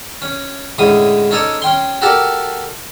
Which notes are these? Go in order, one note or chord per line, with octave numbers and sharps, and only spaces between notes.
C#4
A2 D3 G#3 C#4 D#6
C#4 D#4 A4 C#5 D5
C#4 G5 C6
F#4 G4 A4 A#4 D5 A5